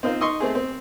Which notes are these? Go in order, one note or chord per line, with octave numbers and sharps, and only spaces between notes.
C4 D#4 F4 C5
D#4 D#5 C6 C#6
A3 C4 G#4
C4